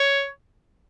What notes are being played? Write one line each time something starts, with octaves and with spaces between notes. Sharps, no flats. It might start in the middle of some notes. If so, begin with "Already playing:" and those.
Already playing: C#5